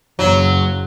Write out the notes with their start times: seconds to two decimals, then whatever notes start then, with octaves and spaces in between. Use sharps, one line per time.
0.19 F#1 F#3